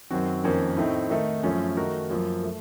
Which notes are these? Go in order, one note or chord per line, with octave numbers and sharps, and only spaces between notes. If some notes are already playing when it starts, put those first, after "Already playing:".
F#2 D#3 F#3 C4 F#4
F2 D#3 A#3 C#4
A2 A3 C4 D#4
D#3 A3 D#4 A4
F#2 F3 A3 C#4
D#3 A3 D#4 F#4 A#4
F#2 F3 A#3
A3